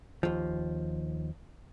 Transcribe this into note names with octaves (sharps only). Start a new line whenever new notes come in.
D#2 F3